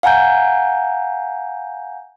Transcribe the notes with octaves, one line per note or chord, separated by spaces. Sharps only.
F5 F#5 G#5 A#5 G6